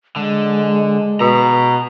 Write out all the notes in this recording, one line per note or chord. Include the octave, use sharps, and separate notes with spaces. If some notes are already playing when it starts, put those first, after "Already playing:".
D3 G#3
B2 A#5